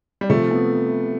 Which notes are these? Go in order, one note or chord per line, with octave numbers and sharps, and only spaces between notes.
G3
C3 F3 A3
B3